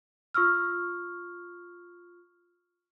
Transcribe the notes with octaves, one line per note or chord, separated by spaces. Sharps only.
F4 C#6 E6 F6